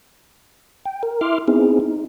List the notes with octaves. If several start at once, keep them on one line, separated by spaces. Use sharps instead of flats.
G5
A#4
E4 E5 C6 D6 F6
B3 C4 D#4 E4 G#4
D#4